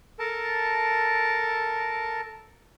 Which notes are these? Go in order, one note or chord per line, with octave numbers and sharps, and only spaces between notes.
A4 A#4 A5